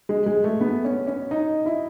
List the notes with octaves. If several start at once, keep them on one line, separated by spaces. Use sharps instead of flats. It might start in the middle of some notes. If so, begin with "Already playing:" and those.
G#3
G#3
A3
B3
C#4
C#4
D#4
E4